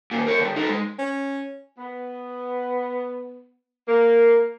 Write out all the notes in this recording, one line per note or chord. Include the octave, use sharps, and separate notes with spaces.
D#2 A#2
A#4 C#5
D3 G3
D#4 A4
G#3
C#4
B3
A#3